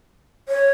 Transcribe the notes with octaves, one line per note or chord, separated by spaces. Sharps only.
C#5